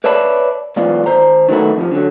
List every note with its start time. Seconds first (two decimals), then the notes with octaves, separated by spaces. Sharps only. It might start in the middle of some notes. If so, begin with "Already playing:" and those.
0.04 B4 C#5 D5 E5 A5 B5
0.76 B1 G#2 E3 B3 F4 D5
1.06 D#3 C5 A#5
1.49 D#3 F#3 A3 B3 E4
1.77 F2 C3 F3
1.91 D3 F#3